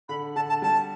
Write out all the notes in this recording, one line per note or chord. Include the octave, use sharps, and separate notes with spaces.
D3 B5
D3 A5
A5
G3 A5